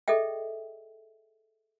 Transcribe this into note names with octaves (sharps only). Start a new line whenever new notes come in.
G#4 A4 D#5 E5 G5